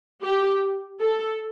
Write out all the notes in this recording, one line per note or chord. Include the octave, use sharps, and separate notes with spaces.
G4
A4